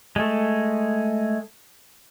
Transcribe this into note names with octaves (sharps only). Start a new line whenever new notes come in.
G#3 A3